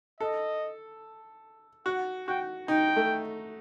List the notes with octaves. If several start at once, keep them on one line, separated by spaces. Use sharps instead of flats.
A4 D#5
F#4 F#5
F#4 G5
D#4 G5
A3